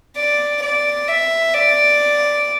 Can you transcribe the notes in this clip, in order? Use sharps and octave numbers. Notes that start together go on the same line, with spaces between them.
D5
D5
E5
D5